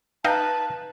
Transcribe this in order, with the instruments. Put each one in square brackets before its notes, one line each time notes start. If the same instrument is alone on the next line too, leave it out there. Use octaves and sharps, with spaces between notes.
[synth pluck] D#4 [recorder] B4 [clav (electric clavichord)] F5 G5 [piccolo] A5